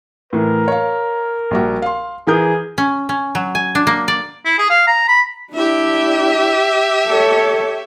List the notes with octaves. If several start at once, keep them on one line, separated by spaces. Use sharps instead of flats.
A2 E3 A#4
C#5 F5
A#1 G3 F#4
F5 C6
E3 G#4 A#4 G6
C#4
C#4
F#3
G#5
D4
A#3
D5
E4
G#4
F5
A#5
B5
D4 E4 G4 E5
A4 C#5